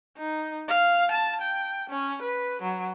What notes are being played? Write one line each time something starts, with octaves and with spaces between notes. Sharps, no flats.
D#4
F5
A5
G5
C#4
B4
F#3